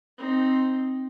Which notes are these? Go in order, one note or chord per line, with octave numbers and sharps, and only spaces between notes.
C4 D#4